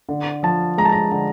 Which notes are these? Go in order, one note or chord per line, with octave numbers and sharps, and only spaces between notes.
D3
F3 A5
G#3 A#5
A5
A#5
D3